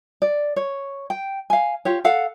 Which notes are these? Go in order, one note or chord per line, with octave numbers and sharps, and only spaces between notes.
D5
C#5
G5
F5 G#5
F4 G4 C#5
A4 F5 F#5